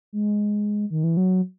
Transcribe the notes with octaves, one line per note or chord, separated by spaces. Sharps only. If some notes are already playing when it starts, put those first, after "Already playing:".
G#3
D#3
E3
F#3